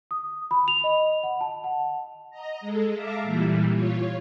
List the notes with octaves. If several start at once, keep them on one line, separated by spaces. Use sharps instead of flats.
D#6
B5
F7
D#5
F#5
A5
F#5
D#5 A#5
G#3 A4
E5 F5 A5 A#5 D6
A#2 E3 G3
F4 C#5